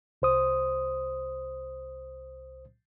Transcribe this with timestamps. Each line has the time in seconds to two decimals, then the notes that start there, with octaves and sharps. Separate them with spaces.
0.22 C2 C5 D#6